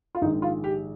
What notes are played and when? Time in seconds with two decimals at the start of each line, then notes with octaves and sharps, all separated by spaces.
0.15 F4
0.22 A#1 G#2 D#3 G#3 D#4
0.42 F4
0.64 G4